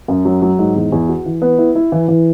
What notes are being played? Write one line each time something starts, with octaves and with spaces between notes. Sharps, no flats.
F#2
F#3
F#3
G#2
E2
E2
F#4
E3
B3
E4
E4
E3
E3